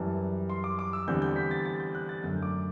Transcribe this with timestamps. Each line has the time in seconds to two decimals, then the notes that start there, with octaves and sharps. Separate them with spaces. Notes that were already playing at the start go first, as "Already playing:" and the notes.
Already playing: F#2 E3 G3 A5
0.49 C6
0.64 D6
0.79 D6
0.93 E6
1.08 E2 D3 G3 C4 G6
1.22 G6
1.36 B6
1.51 A6
1.65 A6
1.80 G6
1.95 F#6
2.09 A6
2.23 F#2 D3 A3 G6
2.42 D6